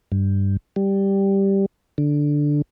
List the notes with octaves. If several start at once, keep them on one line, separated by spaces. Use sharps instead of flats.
G2
G3
D3